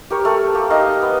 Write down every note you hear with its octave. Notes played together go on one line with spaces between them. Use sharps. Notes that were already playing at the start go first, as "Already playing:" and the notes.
G4 A#4 C#5
A3
A#3 G4
D#4 D#5 F5
B3